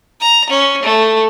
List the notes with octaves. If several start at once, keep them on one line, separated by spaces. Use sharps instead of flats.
A#5
C#4
A3